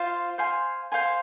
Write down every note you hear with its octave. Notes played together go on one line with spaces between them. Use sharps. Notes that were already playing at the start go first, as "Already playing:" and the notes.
Already playing: F4 C5 F5
C5 F5 G#5 C6
C5 F5 G#5 C6